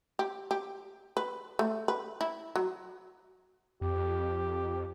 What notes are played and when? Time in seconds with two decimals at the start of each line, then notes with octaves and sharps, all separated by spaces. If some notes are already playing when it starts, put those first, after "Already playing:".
0.19 G4
0.51 G4
1.17 B4
1.59 A3
1.88 B4
2.21 E4
2.56 F#3
3.81 F2 G4